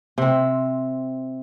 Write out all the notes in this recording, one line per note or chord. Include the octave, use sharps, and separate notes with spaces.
C3 C4